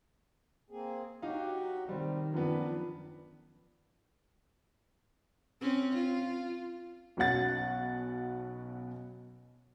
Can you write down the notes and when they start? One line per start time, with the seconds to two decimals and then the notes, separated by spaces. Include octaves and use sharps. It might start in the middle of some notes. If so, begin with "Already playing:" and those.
0.70 A#3 C4 G#4
1.22 F#3 D#4 F#4 G4 F5
1.89 C3 D#3 G3 C4
2.34 F#2 F3 B3 D4 B4
5.61 C4 C#4
5.94 F4
7.17 B1 B2 C#4 F#5 A6